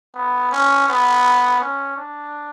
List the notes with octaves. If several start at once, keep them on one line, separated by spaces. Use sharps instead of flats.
B3
C#4
B3
C#4
D4